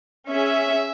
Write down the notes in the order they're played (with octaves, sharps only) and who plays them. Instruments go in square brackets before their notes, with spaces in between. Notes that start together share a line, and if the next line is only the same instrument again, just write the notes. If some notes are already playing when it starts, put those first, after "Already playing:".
[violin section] C#4 G#4 E5